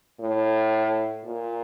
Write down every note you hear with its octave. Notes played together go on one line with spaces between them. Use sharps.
A2
A#2